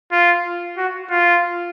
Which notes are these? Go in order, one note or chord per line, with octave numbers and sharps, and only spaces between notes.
F4
F#4
F4